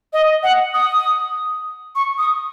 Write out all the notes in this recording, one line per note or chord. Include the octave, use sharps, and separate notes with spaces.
D#5
F#5
D#6
C#6
D#6